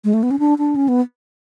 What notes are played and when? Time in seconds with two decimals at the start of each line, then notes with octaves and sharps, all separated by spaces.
0.04 G#3
0.14 A3
0.23 B3
0.31 C#4
0.39 D4
0.58 D4
0.76 C#4
0.88 B3